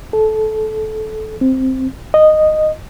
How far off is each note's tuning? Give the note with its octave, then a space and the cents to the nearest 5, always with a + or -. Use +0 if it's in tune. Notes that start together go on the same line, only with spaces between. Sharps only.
A4 -20
C4 +0
D#5 -10